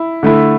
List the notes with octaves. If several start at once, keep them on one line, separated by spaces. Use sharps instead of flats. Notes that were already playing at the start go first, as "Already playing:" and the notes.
Already playing: E4
D3 A3 E4